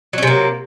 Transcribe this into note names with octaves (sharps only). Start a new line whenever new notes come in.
C3 F#3 A#3 C#4